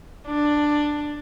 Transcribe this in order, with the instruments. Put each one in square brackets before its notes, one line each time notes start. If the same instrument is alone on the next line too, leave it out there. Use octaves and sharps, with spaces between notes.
[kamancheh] D4